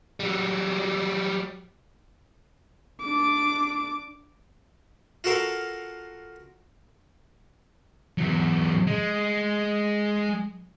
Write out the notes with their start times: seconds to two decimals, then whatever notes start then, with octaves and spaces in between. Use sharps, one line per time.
0.20 F#3 G3
3.01 D4 D6
5.24 F4 F#4 A4 A#4 F5
8.18 E2 F#3
8.87 G#3